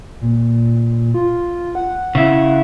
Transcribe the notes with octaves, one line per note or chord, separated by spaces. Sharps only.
A#2
F4
F#5
C#3 E4